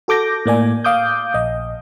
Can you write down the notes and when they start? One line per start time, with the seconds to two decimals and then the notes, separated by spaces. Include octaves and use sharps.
0.08 F#4 A4 D6 G6 A#6
0.46 A2 A#3 D5 G#5
0.84 F5 D6 D#6 G6
1.34 A#1 D#5